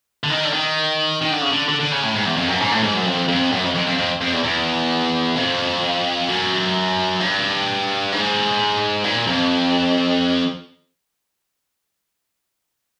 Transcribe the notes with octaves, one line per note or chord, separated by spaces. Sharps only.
D3
D#3
D3
D#3
D#3
D3
C#3
D3
D3
D3
C#3
A2
G#2
E2
F2
F#2
G#2
A2
G#2
F#2
F2
F2
F#2
F2
F2
F2
F2
F2
E2
E2
F2
F#2
G2
G#2
A#2
F2